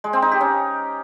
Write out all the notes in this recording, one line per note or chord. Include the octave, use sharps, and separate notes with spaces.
G#3
C4
D#4
G4
C#4